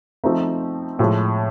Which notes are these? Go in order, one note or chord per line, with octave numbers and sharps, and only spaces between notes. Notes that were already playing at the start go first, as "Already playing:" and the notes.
F3 A3 C4 D#4
A2 F3 G#3